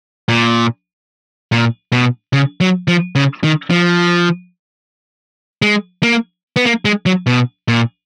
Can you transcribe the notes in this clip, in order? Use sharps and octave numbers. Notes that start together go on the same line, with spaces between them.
A#2
A#2
B2
C#3
F#3
F3
C#3
D#3
F3
G#3
A#3
B3
A#3
G#3
F#3
B2
A#2